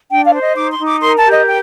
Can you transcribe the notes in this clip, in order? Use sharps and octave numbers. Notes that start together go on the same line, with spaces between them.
D4 G5
F5
C5
D#5
D#4 D6
C6
D#4
D6
A#4 C6
A5
G4
D#5
G5